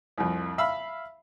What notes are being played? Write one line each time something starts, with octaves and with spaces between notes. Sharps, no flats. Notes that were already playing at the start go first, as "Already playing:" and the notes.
C2 F2
E5 F5 B5 E6